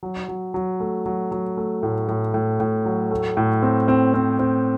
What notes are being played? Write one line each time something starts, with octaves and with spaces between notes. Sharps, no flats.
F#3
F#3
F#3
A3
F#3
F#3
A3
A2
A2
A2
A2
F#3
A3
A2
C4
C4
C4
C4